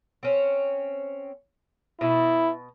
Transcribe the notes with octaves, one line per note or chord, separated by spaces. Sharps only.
C4 C#4
B2 E4